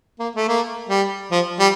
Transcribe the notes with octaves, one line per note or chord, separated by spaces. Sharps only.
A#3
A3
A#3
G3
F3
G3